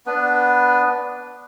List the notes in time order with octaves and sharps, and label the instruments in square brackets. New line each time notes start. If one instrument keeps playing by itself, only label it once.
[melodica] B3 D4 B4